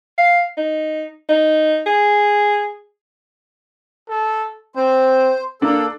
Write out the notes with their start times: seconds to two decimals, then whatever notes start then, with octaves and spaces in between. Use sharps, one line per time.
0.18 F5
0.58 D#4
1.29 D#4
1.87 G#4
4.08 A4
4.76 C4 C5
5.62 A#3 D4 A4